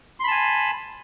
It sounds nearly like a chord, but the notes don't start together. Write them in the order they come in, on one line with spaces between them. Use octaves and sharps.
C6 B5 A5 G#5